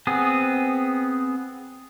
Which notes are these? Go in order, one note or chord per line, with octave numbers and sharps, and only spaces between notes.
B3 C4 G#4